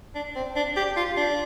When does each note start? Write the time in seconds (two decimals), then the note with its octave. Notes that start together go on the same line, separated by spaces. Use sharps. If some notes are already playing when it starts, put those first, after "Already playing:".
0.15 D4
0.36 C4
0.56 D4
0.77 G4
0.97 F4
1.17 D4